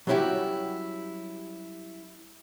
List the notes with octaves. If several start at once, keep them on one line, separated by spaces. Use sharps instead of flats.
F#3 G3 C#4 E4 F#4 G4